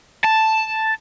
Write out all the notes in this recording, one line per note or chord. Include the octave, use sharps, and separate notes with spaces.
A5